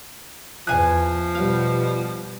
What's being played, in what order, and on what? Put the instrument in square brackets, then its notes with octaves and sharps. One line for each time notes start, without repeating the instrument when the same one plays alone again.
[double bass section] E2 [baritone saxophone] F3 [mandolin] G#5 F#6
[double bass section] B2 G3 [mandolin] F5